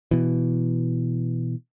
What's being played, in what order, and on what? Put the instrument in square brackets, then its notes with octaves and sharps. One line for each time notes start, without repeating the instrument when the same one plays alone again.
[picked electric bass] B2 E3